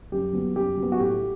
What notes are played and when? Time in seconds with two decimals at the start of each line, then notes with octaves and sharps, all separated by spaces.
0.12 F#2 G4
0.33 F#3 B3
0.56 F#2 G4
0.77 F#3
0.82 B3
0.92 F#4
1.00 A2 G4